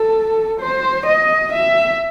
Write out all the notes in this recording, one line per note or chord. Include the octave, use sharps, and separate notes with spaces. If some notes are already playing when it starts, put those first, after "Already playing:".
Already playing: A4
C5
D#5
E5